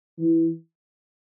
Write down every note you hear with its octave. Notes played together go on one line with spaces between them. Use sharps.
E3